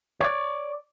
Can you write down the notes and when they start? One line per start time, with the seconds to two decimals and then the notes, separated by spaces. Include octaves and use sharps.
0.20 C#5 D5